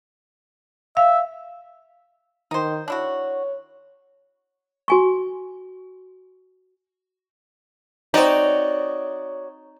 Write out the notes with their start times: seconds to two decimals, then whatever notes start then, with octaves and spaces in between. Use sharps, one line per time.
0.97 E5 F5
2.51 D#3 D#4 C5
2.88 D4 E4 F#4 C#5
4.88 F#4 G#5 C#6
8.14 C4 D#4 F#4 C#5 D5